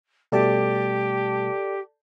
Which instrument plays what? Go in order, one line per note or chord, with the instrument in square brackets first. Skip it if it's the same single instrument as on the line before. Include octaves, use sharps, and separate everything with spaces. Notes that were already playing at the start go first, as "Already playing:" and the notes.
[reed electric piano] B2 G3 A3 [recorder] G4 [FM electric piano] A4 D5 A5